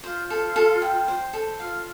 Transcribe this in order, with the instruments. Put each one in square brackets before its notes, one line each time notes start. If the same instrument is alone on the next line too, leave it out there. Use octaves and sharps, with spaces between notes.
[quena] F4 [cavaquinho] C5
[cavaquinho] A4
A4
G5
C5
A4
[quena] F4 [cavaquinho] F5